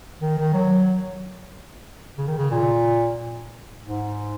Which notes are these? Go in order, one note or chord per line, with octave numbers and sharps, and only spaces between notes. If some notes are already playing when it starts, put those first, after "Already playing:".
D#3
D#3
F#3
C#3
D#3
C#3
A#2
G#2